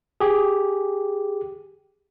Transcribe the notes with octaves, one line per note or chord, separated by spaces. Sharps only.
G4 G#4